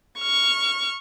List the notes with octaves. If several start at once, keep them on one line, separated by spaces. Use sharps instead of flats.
C#6 F6